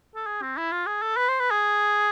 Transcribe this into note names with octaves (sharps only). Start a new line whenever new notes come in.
A4
G#4
C4
E4
F4
G#4
A4
B4
C5
B4
G#4